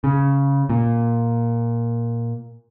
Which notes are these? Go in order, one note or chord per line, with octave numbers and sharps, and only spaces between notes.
C#3
A#2